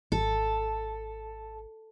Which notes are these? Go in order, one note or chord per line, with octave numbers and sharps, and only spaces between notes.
G#1 A4